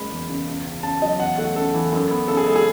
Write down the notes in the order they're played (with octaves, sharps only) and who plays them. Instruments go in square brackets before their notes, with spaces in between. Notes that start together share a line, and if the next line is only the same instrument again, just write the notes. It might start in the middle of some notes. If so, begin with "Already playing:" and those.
Already playing: [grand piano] F#1 G#3 B5
E2
C#3
C#2
C#2
C#3 A5
F#3 D#5
E2 F#5
A3 F#5
C#3 A4
E3
F#2
B3
C#3 A4
G#4
G#3 A4
G#4